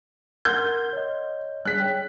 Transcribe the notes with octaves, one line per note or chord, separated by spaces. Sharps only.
A#4 F#5 C6 G6
C#5 D#5
G3 G#4 F#6 B6
C#5 G5